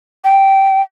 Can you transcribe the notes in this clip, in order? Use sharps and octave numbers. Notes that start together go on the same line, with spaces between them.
G5